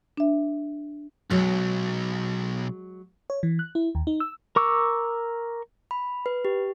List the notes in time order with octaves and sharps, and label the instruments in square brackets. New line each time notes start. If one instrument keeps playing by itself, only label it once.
[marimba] D4 E5
[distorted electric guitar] B1 [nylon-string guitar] F#3 G#3
[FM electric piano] C#5
E3
F#6
E4
D#2
D#4
E6
[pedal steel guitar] A#4 C#6 D6 E6
[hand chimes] B5
B4
G4